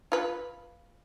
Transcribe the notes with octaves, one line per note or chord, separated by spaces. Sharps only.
F4 B4